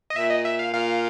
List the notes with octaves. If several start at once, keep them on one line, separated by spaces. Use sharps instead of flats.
D#5
A#2 E5
D#5
E5
F5
A#2 F5